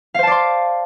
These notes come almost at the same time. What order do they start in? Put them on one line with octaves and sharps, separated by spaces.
F5 C5 A5 D5 C6